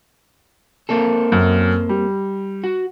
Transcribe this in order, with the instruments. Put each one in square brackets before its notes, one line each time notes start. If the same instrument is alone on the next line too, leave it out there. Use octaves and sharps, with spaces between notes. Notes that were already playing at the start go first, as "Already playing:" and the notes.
[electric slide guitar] A#3 C4 A4
[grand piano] F#2
G3
[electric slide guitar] F#4